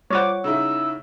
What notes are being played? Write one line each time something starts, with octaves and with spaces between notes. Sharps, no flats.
G3 F4 C5 C#5 F#5 D6
C#3 D#4 E4 E6